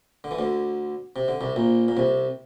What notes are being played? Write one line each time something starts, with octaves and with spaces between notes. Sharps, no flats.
D3
E3
D2 D3
C3
D3
C2 C3
A#1 A#2
A#2
C2 C3